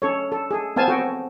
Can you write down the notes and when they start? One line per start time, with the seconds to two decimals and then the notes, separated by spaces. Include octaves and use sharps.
0.02 C#4 A4 C#5
0.32 A4
0.51 G#4 A4
0.76 B3 C4 F5 G#5 A5
0.88 F#4 A4 G5